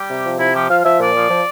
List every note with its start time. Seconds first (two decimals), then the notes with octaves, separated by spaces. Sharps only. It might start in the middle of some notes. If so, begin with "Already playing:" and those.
Already playing: G3 G4
0.10 C3
0.25 F3
0.39 C3 E4
0.54 F3 G4
0.70 F3 F5
0.84 F3 E5
0.99 A#2 D5
1.15 F3
1.30 F3